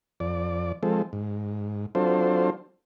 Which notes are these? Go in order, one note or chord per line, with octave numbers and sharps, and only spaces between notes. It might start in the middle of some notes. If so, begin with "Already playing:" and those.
F2 D5
F3 G#3 C4 A4
G#2
F#3 C4 D4 F4 A4 C5